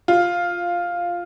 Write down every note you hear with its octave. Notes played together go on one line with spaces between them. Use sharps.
F4